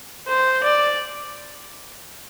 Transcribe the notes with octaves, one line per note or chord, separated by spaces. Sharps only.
C5
D5